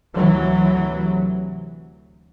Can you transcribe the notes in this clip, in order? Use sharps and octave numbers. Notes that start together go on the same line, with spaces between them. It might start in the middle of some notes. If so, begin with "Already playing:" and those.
D2 C3 E3 F#3